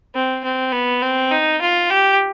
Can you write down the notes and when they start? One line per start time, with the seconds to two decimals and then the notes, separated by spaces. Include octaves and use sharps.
0.15 C4
0.44 C4
0.72 B3
1.02 C4
1.31 D#4
1.61 F4
1.90 G4